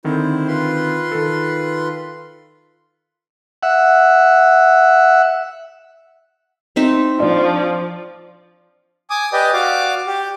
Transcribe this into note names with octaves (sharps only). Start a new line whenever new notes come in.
D3 D#3 C4 E4 C5
F4 B4 C6
D#3 A4
E5 F#5
C4 D#4 E5
F3 D4 D5
G#5 D6 D#6
G4 B4 D5 D#5 G5
F#4 D5 F5 D6
G4